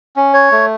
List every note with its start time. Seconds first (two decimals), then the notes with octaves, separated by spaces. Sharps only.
0.16 C#4
0.34 C#5
0.52 A3